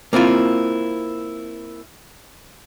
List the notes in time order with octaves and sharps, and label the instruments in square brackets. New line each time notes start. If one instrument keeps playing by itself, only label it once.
[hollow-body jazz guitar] A#3 C4 E4 F4